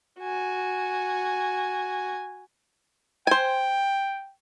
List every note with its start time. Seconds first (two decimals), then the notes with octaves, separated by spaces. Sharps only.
0.19 F#4 G#5
3.27 C5 G5 G#5